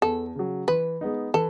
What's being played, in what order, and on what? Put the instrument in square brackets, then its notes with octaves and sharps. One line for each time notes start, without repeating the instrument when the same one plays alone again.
[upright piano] E2 [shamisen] A4
[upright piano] C#3 F#3
[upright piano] E3 [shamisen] B4
[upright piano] G#3 B3 D#4
[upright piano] E3 [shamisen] A4